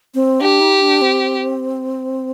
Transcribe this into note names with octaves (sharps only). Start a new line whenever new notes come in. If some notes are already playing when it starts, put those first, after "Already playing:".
C4
D4 G4
D#4
D4
C4